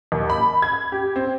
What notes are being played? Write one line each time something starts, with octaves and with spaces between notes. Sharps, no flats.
D#2
B5
G#6
G4
C4